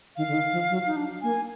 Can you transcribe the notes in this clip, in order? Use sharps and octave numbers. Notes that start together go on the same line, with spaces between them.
D#3 F5
D3
D#3
F3
F#3
D#4
D4
A#3 G#5